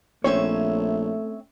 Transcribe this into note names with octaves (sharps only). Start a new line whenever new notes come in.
A#1 A3 C4 C#4 C#5 E5